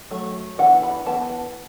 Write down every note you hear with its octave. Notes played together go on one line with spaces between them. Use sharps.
F#3 A3
E3 B3 D4 F#5
B5
E3 B3 A5